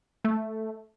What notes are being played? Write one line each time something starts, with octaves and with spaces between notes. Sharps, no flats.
A3